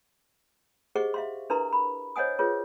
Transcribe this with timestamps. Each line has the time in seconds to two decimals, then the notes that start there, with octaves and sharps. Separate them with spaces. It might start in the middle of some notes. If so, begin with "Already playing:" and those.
0.95 G4 G#4 C5 D#5 F#5 C#6
1.14 E5 F5 C6
1.50 D4 E4 A#4 B4 A#5 C6
1.73 B5
2.16 C5 C#5 D#5 F#5 G#5 D#6
2.39 F4 G#4 B4 C#5